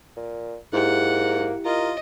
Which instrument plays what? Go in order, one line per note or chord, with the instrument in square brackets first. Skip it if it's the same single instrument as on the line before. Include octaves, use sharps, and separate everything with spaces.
[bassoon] A#2
[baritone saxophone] G#2 [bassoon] A#3 [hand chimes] E4 G4 [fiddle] F#5
[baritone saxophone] F4 [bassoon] A#4 [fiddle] D#5